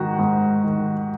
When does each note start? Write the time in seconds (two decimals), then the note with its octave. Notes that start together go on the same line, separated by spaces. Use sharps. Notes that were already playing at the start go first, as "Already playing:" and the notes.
Already playing: G#2 D#3 F#4
0.19 G#2
0.64 D#3